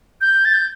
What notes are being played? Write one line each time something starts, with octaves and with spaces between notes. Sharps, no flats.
G6
A6
G6